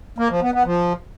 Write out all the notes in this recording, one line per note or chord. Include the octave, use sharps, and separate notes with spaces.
A#3
F3
B3
B3
F3